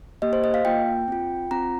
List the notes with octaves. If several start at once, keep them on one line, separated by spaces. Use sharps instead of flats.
A#3 G4 D#5
C5
D#5
F5
A#3 F4 G5
C4 F4
C4 F4 A#5